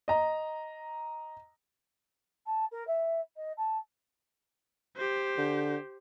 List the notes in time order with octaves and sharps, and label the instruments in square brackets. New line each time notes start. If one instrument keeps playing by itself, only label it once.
[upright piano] D#5 A#5
[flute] A5
A#4
E5
D#5
A5
[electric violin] G4 C5
[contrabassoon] D3